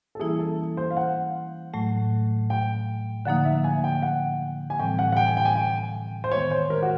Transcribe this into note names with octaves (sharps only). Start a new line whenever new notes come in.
A4
E3 G3 A#3 C#4 E4 G#4
A4
C5
F5
F#5
A2 F#3 A3
G5
D3 F3 A#3 D#4 F#5
E5
G#5
G5
F#5
G#5
A2 E3 G3 C4 G5
F#5
F#5
G5
G#5
G5
G#5
G5
C5
D#3 G#3 B3 C#5
C5
A#4
F#4